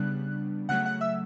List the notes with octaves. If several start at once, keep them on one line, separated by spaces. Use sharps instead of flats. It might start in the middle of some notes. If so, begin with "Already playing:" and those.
Already playing: C#3 G3 B3 D4 F#6
C#3 F#3 A3 F#5 F#6
F#5 F#6
E5 E6